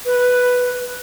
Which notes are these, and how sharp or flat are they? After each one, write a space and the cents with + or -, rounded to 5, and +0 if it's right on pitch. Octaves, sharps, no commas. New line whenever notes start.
B4 +0